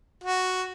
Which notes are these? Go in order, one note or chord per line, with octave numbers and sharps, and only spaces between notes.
F#4